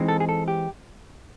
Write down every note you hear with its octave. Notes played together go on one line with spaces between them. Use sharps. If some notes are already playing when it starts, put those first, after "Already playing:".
Already playing: E3 G#3 C4 D#4
A4
G#4
A4
G4